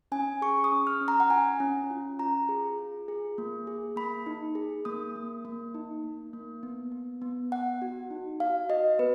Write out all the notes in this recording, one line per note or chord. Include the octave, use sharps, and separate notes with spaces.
C#4 G#5
G#4 C#6
D#6
C#4
F6
C#4
A#5
F#5
F4 G#5
C#4
F4
F4 A#5
G#4
F4
G#4
A#3
G#4
A#3 B5
D#4
G#4
A#3 D#6
A#3
A#3
D#4
A#3
A#3
B3
B3
B3
B3 F#5
F#4
D#4
F#4 F5
F#4 D#5
B3 B4